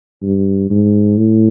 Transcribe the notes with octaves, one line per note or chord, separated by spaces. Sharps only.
G2
G#2
A2